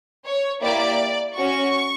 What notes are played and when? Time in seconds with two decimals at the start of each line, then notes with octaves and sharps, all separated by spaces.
0.25 C#5
0.62 A#3 E4 G4 D5
1.35 C#4 F#4 C#6